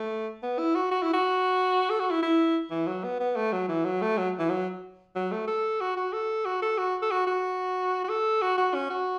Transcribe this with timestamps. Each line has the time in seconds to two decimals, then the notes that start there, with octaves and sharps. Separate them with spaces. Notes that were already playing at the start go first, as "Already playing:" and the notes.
Already playing: A3
0.43 B3
0.58 E4
0.75 F#4
0.91 F#4
1.02 E4
1.13 F#4
1.90 A4
2.00 F#4
2.11 E4
2.22 E4
2.70 E3
2.87 F#3
3.04 B3
3.20 B3
3.36 A3
3.52 F#3
3.68 E3
3.84 F#3
4.01 A3
4.17 F#3
4.39 E3
4.50 F#3
5.15 F#3
5.32 A3
5.47 A4
5.81 F#4
5.97 F#4
6.13 A4
6.45 F#4
6.62 A4
6.78 F#4
7.02 A4
7.11 F#4
7.27 F#4
8.04 F#4
8.09 A4
8.42 F#4
8.57 F#4
8.74 C#4
8.90 F#4